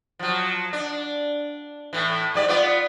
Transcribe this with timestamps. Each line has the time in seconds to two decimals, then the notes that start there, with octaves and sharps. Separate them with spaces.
0.19 F3 F#3
0.73 D4
1.93 A2 E3
2.34 G#2 G3 D5
2.48 B3 F4 D5